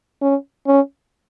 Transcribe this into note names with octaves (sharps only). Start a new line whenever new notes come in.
C#4
C#4